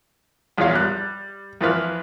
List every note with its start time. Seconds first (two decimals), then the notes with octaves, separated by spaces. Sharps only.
0.58 A#1 E2 E3 F4 C#5 F5
0.75 G3 F#6
1.61 F2 E3 F4 B4 F6